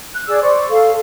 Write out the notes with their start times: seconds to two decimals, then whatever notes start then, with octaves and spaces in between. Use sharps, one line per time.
0.15 F#6
0.27 G#4 D5 E6
0.42 C5 D5 C#6
0.70 A4 F5